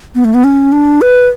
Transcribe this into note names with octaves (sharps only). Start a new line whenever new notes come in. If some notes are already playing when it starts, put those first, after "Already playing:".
B3
A3
B3
C#4
D4
B4